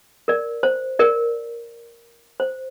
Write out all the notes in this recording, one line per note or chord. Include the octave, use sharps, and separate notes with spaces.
A#4 D5
C5
A#4 D5
C5